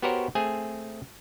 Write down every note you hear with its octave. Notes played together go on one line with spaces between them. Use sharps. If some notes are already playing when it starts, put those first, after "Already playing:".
B3 F#4 G4 A#4 C5 C#5
A3 C4 G#4 G#5